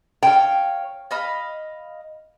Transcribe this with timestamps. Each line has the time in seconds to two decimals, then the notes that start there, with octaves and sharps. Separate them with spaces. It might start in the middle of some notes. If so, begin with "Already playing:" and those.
0.23 C#5 F5 G5
1.11 D#5 F5 B5